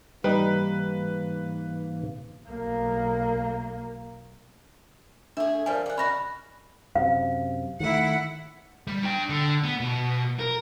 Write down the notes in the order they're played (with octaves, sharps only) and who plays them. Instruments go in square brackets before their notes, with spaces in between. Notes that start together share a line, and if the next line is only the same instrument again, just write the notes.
[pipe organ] G#2 E3 A#3 [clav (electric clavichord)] G3 D#4 [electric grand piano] B4
[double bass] B1 A#3
[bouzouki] A3 G#4 [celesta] D4
[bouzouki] F3 G3 [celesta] A#4 D5 G#5
[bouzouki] G4 F#5
[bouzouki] C#4 D#4 F#4 [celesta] B5 A#6
[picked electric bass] F#2 C3 [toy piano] F5
[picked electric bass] D#3 A3 [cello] E4 F#5
[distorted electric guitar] G3
D4 G5
D3
B3
B2
A#4